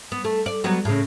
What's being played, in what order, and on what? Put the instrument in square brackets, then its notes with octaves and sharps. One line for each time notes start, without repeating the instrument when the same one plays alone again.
[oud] B3
A3
D5
F#3 G3 B3
A2 C#3